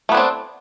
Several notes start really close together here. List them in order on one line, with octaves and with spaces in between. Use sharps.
A3 B3 D4 C4